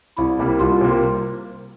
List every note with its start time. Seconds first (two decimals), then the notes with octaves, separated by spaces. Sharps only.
0.18 C2 E4
0.39 C3 G3 A#3
0.60 C2 F4
0.81 C3 G3 A#3